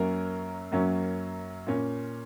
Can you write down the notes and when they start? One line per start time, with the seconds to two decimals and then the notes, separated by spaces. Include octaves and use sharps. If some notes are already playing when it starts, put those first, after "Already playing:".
Already playing: F#2 F#3 A#3 C#4 A#4
0.72 F#2 F#3 A#3 C#4
1.67 A#2 A#3 C#4